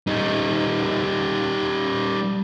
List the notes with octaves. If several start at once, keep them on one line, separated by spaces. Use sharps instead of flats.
G3 D#4